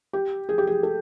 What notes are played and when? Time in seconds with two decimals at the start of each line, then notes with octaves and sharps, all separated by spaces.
0.13 G4
0.49 G#4
0.58 G4
0.67 G#4
0.83 A4